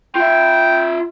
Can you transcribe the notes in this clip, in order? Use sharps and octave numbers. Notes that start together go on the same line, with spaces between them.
F4 E5 G5